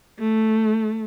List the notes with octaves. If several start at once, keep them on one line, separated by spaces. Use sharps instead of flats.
A3